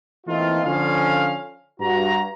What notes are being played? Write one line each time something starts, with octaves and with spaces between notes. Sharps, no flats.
E3 A3 A#3 C4 D#4 F4
D3 F3 C#4 F5
G2 F#4 A#5